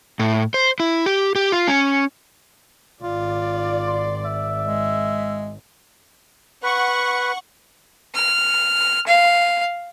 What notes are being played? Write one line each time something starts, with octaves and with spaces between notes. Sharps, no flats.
A2
C5
E4
G4
G4
F4
C#4
G#1 F4 D5
C6
E5
G#3
B4 F#5 C#6
F6
F5